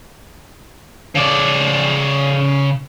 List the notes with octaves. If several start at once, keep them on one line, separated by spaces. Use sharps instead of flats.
C#3 D5